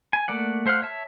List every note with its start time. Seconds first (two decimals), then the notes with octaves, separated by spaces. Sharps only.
0.13 G#5
0.28 A3 A#3 D5 F#5
0.66 A3 C5 F5 F#5 F6
0.82 C#5 E5 A5